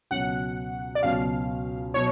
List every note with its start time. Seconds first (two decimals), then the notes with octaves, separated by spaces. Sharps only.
0.11 C#2 B2 F#3 C#4 F#5
0.95 D5
1.03 C#2 B2 F#3 C#4 F5
1.94 B2 F#3 C#5